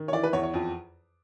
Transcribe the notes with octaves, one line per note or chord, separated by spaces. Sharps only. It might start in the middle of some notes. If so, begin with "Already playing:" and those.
Already playing: D#3
C#5
E3 D5
B4
E2 C#5
C#5
F2